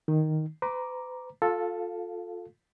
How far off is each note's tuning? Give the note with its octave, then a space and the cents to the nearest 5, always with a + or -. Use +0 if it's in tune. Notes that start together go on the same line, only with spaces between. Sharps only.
D#3 +0 D#4 +0
B4 +45 A#5 +10 D6 +0
F4 +25 A4 +0 F5 +0